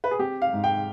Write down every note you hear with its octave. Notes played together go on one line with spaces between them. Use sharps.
B4
G#4
C4 G4
F5
G#2
G5